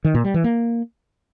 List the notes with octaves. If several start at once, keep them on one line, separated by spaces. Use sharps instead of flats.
D#3
A#2
G3
E3
A#3